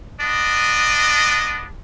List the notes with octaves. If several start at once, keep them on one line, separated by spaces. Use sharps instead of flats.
B3 D4 D#5